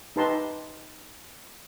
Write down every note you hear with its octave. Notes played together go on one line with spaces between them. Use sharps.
D#4 G4 B4 A5 A#5 C6